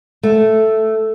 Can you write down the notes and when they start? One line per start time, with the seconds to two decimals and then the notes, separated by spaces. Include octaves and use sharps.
0.23 A3